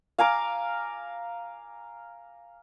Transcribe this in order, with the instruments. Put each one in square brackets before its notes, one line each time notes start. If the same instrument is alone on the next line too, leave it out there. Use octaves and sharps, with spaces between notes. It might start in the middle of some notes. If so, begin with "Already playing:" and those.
[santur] F5 G#5 A#5 D6